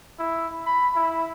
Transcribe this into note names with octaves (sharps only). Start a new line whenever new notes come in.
E4
B5
E4